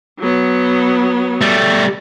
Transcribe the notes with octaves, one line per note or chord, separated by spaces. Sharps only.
F#3 B3
G3 A3